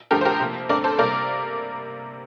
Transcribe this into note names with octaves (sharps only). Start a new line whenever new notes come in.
G2 D3 F3 A3 G4 A#4
C5
G4 A#4
C3 F3 A#3
G2 D3 A3 C4 A#4 D5
A4 C5
C3 G3 A#3 A#4 D5